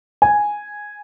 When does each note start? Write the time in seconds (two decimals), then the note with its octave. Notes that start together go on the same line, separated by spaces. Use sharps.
0.22 G#5